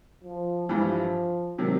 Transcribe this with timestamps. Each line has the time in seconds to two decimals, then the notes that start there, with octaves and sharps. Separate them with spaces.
0.24 F3
0.69 G2 E3 F3 G3
1.58 C3 D#3 F#3